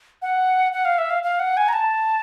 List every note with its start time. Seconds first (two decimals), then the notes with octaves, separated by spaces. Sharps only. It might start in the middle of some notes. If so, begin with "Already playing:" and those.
0.22 F#5
0.72 F#5
0.85 F5
0.98 E5
1.10 F5
1.23 F5
1.40 F#5
1.57 G#5
1.68 A#5
1.73 A5